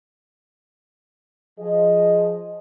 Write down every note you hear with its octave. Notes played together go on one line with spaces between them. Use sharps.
F3 G#4 D#5